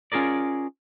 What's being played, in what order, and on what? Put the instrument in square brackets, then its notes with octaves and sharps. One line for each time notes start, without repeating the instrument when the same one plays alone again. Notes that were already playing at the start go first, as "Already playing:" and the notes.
[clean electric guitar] C#4 F4 G#4 A#4 D5